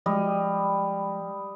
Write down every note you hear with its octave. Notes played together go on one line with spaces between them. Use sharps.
F3 G3 G#3 D#5